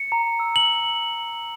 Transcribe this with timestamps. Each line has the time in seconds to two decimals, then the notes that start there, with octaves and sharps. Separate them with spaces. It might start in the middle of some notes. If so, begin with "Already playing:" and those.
Already playing: C#7
0.12 A#5
0.40 E6
0.56 F#7